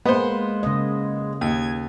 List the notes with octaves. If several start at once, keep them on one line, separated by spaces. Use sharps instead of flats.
G#3 A#3 B3 C5
C#3 D#5
D#2 G#6